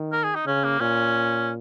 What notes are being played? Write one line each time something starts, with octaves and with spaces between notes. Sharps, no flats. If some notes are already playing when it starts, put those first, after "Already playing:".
Already playing: D#3
A#4
G#4
D#4
C#3 C#4
A#3
A#2 C#4